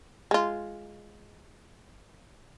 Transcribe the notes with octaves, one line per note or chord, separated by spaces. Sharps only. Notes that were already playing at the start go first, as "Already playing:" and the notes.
G#3 F4